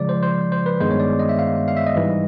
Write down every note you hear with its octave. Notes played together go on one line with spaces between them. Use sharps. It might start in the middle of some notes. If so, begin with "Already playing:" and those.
Already playing: C#3 F3 G#3 D5
C5
C5
C5
B4
G2 D#3 G#3 B3 C5
C#5
D5
D#5
E5
F5
F5
E5
D#5
G#2 E3 G3